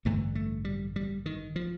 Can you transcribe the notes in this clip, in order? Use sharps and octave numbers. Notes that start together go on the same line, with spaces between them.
A1 G2 D3 A3
A3
G3
G3
D#3
F3